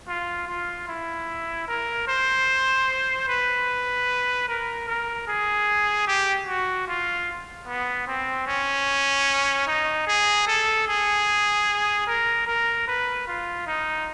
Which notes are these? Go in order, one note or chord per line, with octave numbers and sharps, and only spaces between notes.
F4
F4
E4
A#4
C5
B4
A#4
A#4
G#4
G4
F#4
F4
B3
C4
C#4
D#4
G#4
A4
G#4
A#4
A#4
B4
F4
D#4